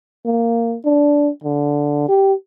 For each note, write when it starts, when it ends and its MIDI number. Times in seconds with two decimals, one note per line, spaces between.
0.26 0.76 58
0.85 1.29 62
1.44 2.05 50
2.09 2.34 67